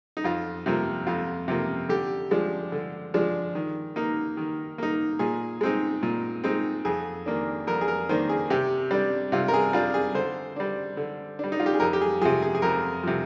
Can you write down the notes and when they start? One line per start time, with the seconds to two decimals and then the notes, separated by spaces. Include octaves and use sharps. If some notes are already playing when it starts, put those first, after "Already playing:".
0.17 D#4
0.24 F2 F4
0.66 C3 F3 A#3
1.07 F2 F4
1.48 C3 F3 A#3
1.89 D3 G4
2.31 F3 G#3 D4
2.72 D3
3.14 F3 G#3 D4
3.55 D#3
3.96 A#3 D#4
4.37 D#3
4.78 A#3 D#4
5.19 A#2 G#4
5.61 G#3 C4 D#4
6.03 A#2
6.44 G#3 C4 D#4
6.85 F2 G#4
7.26 D#3 A#3 D4
7.67 F2 A#4
7.81 G#4
7.88 A#4
8.09 D#3 A#3 D4 C5
8.29 G#4
8.50 C3 G4
8.91 G3 D4
9.32 C3 F4
9.48 A#4
9.54 G#4
9.73 G3 D4 F4
9.94 G#4
10.15 D3 C5
10.56 G3 D4
10.97 D3
11.39 G3 D4
11.52 D#4
11.60 F4
11.66 G4
11.74 G#4
11.80 F2 A#4
11.93 G4
12.01 G#4
12.21 F3 G#4
12.25 C3
12.42 G#4
12.55 G#4
12.62 F2 A#4
13.03 C3 F3